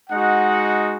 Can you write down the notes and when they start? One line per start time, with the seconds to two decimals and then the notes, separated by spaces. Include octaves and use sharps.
0.10 G#3 D#4 F#4 F#5